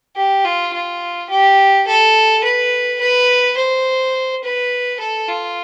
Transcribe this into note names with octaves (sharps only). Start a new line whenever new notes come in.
G4
F4
F4
G4
A4
B4
B4
C5
B4
A4
F4